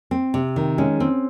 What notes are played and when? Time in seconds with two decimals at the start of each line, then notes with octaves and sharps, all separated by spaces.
0.11 C4
0.34 C3
0.56 D#3
0.78 G#3 C#4
1.00 C4